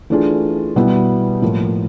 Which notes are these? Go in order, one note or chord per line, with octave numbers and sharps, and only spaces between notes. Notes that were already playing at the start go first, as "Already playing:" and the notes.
E3 A3 D4 F4 G#4
B2 G3 B3 E4 G4
A2 F3 A#3